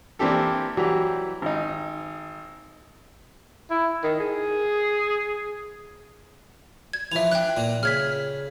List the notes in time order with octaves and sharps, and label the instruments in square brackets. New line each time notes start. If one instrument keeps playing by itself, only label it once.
[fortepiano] E3 A#3 C4 D4 G4 A4
E3 F#3 G3 F#4 G4
G#1 D#4
[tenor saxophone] E4
D#3
G#4
[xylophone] G#6
[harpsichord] E3 F3 [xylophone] E5 F7
[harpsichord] D4 [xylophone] G5 F#6
[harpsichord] A#2 A#3
[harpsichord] C#3 [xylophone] F6 G#6 B6